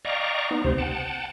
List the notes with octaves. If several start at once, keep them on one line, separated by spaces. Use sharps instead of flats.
D5 D#5 F5 G5 A#5 C#6
B3 D#4
D2 C3 C5
F#5 G5 A5